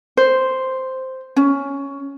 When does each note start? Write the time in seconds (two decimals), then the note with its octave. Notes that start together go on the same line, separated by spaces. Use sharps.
0.17 C5
1.36 C#4